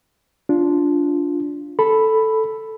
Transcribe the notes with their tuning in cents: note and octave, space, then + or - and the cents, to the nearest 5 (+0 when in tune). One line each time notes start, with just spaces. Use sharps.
D4 -15 F4 +0
A4 +0 B5 +0